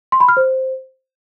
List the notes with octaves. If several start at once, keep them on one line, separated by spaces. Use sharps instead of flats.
C6
B5
F6
C5